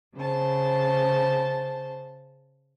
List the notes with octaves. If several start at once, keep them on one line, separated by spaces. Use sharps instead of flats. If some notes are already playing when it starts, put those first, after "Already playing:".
C#3 C5 A5